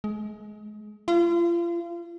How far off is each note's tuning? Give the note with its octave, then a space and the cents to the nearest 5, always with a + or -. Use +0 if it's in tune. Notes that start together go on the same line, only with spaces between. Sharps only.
G#3 +25
F4 -35